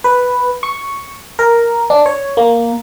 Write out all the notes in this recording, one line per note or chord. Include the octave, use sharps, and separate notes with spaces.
B4
C#6
A#4
D4
C#5
A#3